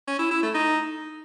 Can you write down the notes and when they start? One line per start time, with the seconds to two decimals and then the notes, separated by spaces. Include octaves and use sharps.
0.07 C#4
0.19 E4
0.31 E4
0.42 A3
0.54 D#4